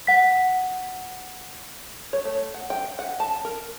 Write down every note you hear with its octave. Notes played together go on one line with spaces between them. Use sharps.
F#5 B6
C#5
A3
F#5
G5
F#5
A5
A#4